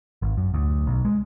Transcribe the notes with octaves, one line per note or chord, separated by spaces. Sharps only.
G#1
F#2
D2
B1
G#3